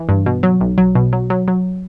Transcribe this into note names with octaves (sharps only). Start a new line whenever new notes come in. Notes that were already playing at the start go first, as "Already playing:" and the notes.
Already playing: E3
G2
B2
F#3
B1
F#3
B2
F#3
F#3
F#3